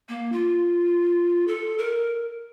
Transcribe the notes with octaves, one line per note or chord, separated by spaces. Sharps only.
A#3
F4
A4
A#4